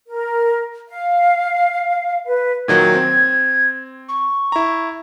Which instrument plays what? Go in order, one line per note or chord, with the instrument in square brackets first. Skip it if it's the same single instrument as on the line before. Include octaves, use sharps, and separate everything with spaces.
[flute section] A#4
F5
B4
[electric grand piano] A#2 D#3 F#3 [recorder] G#6
[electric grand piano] C4
[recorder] C#6
[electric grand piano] E4 A#5